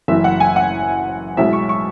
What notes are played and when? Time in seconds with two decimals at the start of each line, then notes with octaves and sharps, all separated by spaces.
0.08 F#1 F#2 E3 E5
0.24 F#5
0.40 G#5
0.56 F#5
1.37 B1 B2 G#3 E4 E5
1.53 C#6
1.69 C#6